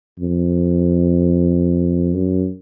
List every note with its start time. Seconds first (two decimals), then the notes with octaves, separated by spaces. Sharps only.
0.19 F2
2.14 F#2